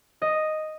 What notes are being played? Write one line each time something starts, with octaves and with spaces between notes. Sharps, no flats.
D#5